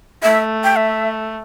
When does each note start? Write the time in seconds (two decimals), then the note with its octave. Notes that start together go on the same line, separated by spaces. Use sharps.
0.23 A3 E5
0.64 G5
0.76 E5